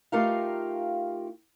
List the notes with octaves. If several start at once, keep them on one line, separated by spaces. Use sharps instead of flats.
A3 D#4 F4 G4 A#4 F5